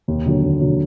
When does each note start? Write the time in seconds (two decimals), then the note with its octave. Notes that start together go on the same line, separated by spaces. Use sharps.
0.08 D#2
0.26 D3 F#3
0.43 D#2
0.61 D3 F#3